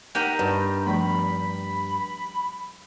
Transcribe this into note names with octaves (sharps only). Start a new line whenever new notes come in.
D#4 G4 A#4 F#5 G5
G2 D5 A5
F3 A3 B3 B5